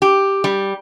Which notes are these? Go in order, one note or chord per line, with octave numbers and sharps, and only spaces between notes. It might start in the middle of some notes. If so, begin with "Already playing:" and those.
G4
G3